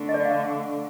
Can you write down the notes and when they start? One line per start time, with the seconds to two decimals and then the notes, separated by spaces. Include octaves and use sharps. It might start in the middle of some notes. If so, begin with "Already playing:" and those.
Already playing: D3 A3 D4
0.09 D#5
0.14 D5
0.25 F5